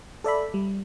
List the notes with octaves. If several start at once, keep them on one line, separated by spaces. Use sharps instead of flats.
A4 D5 E5 B5
G3